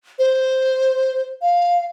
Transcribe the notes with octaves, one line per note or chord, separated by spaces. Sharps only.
C5
F5